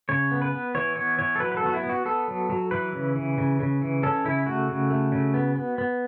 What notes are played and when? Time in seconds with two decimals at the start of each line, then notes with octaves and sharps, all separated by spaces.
0.09 C#3 C#5
0.31 B3
0.42 B4
0.52 B3
0.75 E3 C#5
0.96 B3 C#5
1.19 E3 C#5
1.36 A4
1.40 F#3 B4
1.52 B4
1.57 A4
1.63 B3 F#4
1.74 E4
1.84 B3
1.89 F#4
2.05 B3 A4
2.28 F#3
2.50 F#3
2.71 E3 B4
2.93 C#3
3.16 E3
3.38 C#3
3.60 C#3
3.82 E3
4.03 C#4 A4
4.25 C#3 E4
4.46 A3 F#4
4.69 C#3
4.91 A3
5.12 C#3
5.34 B3
5.56 B3
5.78 B3